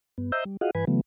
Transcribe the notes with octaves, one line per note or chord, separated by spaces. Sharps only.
G2 B3
C5 D#5 E5 A#5 E6 G6
G3
F4 F#4 G#4 D#5 F5 F#5
G2 E3 B4 G#5 B5
C#3 E3 F#3 A3 B3